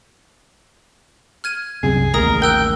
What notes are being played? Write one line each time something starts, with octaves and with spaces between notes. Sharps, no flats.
F6 G#6 D#7
C2 F#2 C4 G#4
A1 D#2 G#3 A#4 A#5 D#6
A#4 G5 E6 F#6